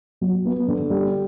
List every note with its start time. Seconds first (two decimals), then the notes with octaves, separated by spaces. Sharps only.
0.21 F#3
0.45 B3
0.68 D3
0.90 G3